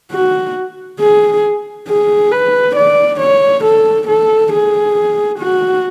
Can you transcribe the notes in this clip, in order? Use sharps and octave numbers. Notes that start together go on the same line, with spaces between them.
F#4
G#4
G#4
B4
D5
C#5
A4
A4
G#4
F#4